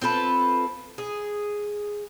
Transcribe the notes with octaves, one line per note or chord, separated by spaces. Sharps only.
C4 F4 A4 B4
G#4